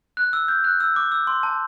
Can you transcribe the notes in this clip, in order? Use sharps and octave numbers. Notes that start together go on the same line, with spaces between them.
F#6
E6
G6
F#6
E6
D6
E6
C6
A5